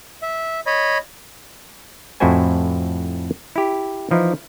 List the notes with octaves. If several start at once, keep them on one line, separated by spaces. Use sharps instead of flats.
E5
C#5 D#5 B5
F2 A2 E4 F#4 C5 G#5
E4 G4
E3 F3 D#4 E4